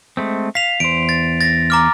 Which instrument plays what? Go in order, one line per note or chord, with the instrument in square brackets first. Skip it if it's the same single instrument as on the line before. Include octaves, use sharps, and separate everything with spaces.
[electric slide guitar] G#3 A3 C4
[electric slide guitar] F5 [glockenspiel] B6 F7
[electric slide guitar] E2 C5 [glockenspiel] D7
[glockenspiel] A6
A6 A#6
A#5 D6 F6